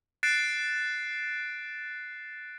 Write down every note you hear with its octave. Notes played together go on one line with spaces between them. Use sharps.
F#6 A6 C7 D7 E7